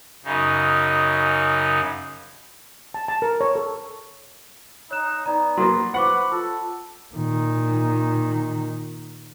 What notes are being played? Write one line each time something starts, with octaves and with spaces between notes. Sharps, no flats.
F#2 C#3 D#4
A5
A5
A#4
C#5
A4
D#4 C#5 F#6 E7
B3 D#4 D5 A#5
F#3 A#3 C6 A6
B4 C5 F#5 C#6 D6
F4 A4
A#2 D#3